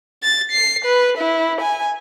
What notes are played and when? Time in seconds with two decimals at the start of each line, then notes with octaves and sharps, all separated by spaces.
0.23 A6
0.52 C7
0.85 B4
1.18 E4
1.61 G#5